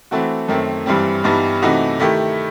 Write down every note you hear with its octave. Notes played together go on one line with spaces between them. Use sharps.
E3 A3 C4 F#4
F#2 D#3 A3 C4
G2 E3 G3 C4
G2 E3 G3 B3 D#4
C3 E3 A3 D#4 F#4
D#3 A3 E4 G4